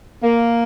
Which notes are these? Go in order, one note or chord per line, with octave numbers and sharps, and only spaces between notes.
A#3